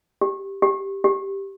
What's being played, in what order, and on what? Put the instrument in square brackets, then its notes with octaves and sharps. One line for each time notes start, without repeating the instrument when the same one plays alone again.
[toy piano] G4
G4
G4